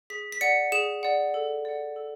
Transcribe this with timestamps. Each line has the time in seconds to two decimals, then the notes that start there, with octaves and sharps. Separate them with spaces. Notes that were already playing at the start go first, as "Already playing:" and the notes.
0.10 G#4 B6
0.32 B6
0.41 D5 F#5 C#7
0.72 G#4 E7
1.03 D5 F#5
1.34 A4
1.65 D5 F#5
1.96 A4